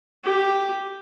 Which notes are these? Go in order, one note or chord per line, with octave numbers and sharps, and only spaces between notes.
G4